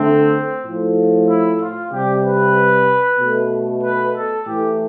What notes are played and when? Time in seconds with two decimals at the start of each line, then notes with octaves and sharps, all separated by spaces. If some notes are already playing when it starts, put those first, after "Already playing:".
Already playing: D3 A3 C4
0.64 A2 F3 A3
1.28 E4
1.60 F4
1.91 C3 G3 G4
2.23 B4
3.19 B2 A3
3.82 B4
4.14 A4
4.47 A2 E3 A3 G4